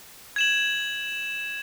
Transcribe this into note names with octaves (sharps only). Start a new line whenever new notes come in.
G#6 E7 F#7